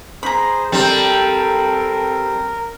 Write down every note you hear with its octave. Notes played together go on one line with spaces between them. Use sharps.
G#4 C5 A#5 B5
G3 C4 A4 A#4